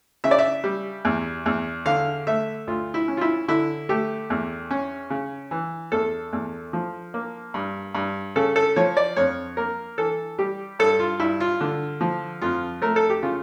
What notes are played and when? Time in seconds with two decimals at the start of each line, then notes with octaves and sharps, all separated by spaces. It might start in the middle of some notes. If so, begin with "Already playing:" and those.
0.24 C#3 E5
0.31 D5
0.39 E5
0.64 G3
1.05 E2
1.46 E2
1.86 D3 F5
2.27 A3 E5
2.67 D2 F4
2.94 E4
3.08 C#4
3.17 F4
3.21 E4
3.48 D3 E4
3.89 A3 G4
4.30 E2
4.71 C#4
5.10 C#3
5.51 E3
5.92 E2 A4
6.33 E2
6.73 F3
7.14 A#3
7.54 G2
7.95 G2
8.36 C#3 A4
8.56 A4
8.76 F3 C#5
8.97 D5
9.16 F2 C#5
9.57 A#3 A#4
9.98 E3 A4
10.39 G3 G4
10.79 G2 A4
10.99 F4
11.20 G2 E4
11.40 F4
11.61 D3
12.01 F3
12.42 F2 F4
12.82 A3 A#4
12.96 A4
13.10 G4
13.23 C#3 F4